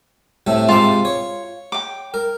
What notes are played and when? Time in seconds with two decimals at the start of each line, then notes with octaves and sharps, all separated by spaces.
0.47 A2 C3 A3
0.69 G#2 C3 F4 A5 D6
1.05 C#5
1.72 G5 D6
2.14 A#4